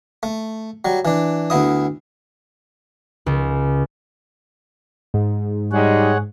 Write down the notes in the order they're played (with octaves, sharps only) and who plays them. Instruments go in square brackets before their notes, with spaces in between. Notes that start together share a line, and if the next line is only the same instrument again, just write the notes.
[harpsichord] A3
F#3 G3
E3 D4
D2 B3 E4 D#6
[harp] C#2
[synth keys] G#2
[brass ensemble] G3 G#3 D#4 [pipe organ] G#4 C#5 F#5